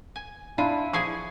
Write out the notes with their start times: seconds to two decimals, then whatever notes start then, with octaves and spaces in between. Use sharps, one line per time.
0.16 G#5
0.58 D4 E4 F4 B5 D#7
0.93 F3 G#4 G#5 C#6